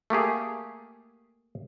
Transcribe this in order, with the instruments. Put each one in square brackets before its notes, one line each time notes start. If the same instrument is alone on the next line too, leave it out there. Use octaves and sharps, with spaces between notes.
[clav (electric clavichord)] A3 A#3 G4 G#4